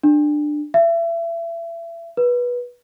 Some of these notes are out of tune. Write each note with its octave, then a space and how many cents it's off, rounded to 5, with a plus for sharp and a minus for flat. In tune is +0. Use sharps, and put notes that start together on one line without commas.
D4 +20
E5 +30
B4 -20